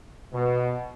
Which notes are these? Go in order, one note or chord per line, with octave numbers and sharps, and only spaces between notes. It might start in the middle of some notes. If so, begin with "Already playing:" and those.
B2